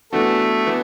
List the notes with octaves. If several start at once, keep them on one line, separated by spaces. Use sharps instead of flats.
E3 A3 B3 D4 F#4 A4
E3 B3